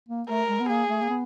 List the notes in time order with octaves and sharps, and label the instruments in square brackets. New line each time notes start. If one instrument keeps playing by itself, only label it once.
[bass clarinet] A#3
[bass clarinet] A3 [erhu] A#4
[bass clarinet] G#3
B3
[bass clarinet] A#3 [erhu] G#4
[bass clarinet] A3
A#3
B3